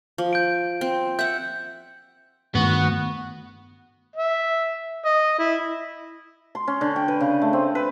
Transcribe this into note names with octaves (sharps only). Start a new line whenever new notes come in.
F3
G6 D7
C4
E5 F#5 G6
G2 D#3 A3 B3 F#4
E5
D#5
E4
C6
C#4
D3
G5
B4
C#3
A3
C4
B4